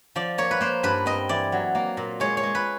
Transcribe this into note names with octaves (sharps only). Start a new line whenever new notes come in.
F3 D5
A#3 C#5
B4
A#3 C5
G2 B4
C4 D#5
E3 D5
F#3
A#3
A#2
G#3 C#5
C#5
G#3
B4